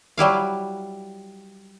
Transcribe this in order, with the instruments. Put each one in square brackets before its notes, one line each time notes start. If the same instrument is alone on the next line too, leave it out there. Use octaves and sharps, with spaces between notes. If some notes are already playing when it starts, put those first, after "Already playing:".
[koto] F#3 G3 E4 F5